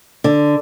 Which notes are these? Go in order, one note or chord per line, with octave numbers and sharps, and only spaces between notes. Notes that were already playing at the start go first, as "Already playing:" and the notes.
D3